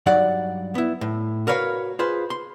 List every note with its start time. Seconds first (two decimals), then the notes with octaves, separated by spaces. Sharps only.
0.06 G2 F#3 D#4 D5 F#5
0.75 B3 E4
1.01 A2
1.47 F#4 A#4 B4 C#5 D#5 F5
1.99 F4 G#4 B4 C5
2.30 C6